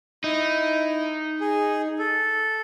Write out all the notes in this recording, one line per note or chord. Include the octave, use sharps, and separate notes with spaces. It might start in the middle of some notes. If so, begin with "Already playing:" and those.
D#4 E4
G#4
A4